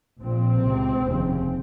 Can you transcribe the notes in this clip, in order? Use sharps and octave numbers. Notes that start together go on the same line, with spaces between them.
A#1 A#2 C4
C#2 C3
F1 D#2 C#3